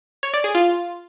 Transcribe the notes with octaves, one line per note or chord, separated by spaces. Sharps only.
C#5
D5
G#4
F4